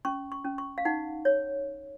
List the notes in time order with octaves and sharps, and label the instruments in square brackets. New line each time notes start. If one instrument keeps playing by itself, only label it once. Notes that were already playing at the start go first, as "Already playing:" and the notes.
[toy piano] C#4 C#6
C#6
C#4
C#6
F5
D#4 F#5
C#5